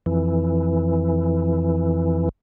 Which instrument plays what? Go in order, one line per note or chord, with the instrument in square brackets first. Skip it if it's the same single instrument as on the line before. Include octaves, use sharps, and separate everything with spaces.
[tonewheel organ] F2 E3